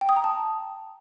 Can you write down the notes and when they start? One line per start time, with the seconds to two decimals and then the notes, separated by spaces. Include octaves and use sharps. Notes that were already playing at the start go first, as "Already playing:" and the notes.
0.01 G5
0.09 D#6
0.16 A#5
0.24 A5